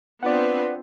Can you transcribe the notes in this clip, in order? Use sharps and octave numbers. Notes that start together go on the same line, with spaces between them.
B3 C4 D4 F4 B4 D5 F#5